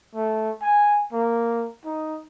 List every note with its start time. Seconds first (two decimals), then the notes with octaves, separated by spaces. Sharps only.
0.15 A3
0.61 G#5
1.13 A#3
1.85 D#4